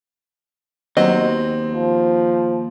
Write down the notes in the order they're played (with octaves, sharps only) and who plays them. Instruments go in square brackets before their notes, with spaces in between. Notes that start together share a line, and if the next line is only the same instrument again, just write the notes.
[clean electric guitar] D#2 [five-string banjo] F#3 B3 D#5 [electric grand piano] C4
[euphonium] F3